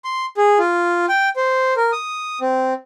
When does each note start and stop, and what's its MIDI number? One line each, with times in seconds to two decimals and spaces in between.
0.05 0.26 84
0.37 0.59 68
0.59 1.06 65
1.09 1.29 79
1.36 1.74 72
1.77 1.91 70
1.92 2.39 87
2.41 2.73 60